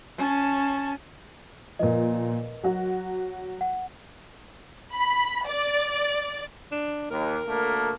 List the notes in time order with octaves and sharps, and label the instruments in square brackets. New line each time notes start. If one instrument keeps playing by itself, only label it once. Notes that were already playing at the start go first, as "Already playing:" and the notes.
[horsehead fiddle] C#4 A5
[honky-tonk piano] A#2 F3 [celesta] A#4 B4 D#5
[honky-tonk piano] F#3 F#4
[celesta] F#5
[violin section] B5
D5
[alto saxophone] D4
[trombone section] D#2 [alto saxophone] A#4
[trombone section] D2 A3 A#3